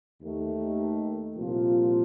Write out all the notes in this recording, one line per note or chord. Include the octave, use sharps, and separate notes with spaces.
D#2 D#3 A3
C2 A#2 F3 A#3 F4